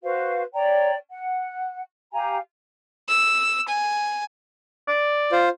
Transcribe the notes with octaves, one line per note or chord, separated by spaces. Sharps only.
F#4 B4 C5 F5
C#5 D5 G5 A#5
F#5
G4 F5 G#5 A#5
E6
G#5
D5
F4 C5